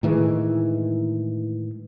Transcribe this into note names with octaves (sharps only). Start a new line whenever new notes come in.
A2 D#3 E3 G#3